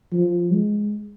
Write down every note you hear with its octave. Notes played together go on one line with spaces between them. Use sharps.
F3
G#3